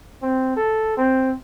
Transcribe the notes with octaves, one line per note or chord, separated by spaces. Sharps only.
C4
A4
C4